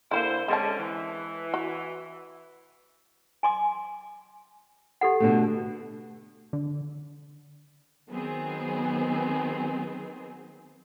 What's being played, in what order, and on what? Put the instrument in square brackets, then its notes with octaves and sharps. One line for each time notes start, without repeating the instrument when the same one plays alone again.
[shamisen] D3 G3 A#3 [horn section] E4 C5
[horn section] D3 C#4 [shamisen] G#3 C4 A5
[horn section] E3
[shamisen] F#4
[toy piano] G#5 C6 D6
G4 A4 F#5
[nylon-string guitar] B2 D3 A3
[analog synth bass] D3
[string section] D#3 F#3 B3 C4 G#4